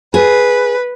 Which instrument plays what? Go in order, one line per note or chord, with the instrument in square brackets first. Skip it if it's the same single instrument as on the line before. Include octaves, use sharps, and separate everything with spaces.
[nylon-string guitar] G#4 [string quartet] B4